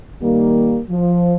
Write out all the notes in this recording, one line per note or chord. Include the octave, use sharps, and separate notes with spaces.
D#3 G3 A#3
F3